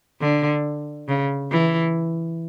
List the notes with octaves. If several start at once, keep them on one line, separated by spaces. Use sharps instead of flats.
D3
C#3
E3